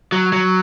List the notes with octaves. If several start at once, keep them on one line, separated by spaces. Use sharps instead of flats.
F#3
F#3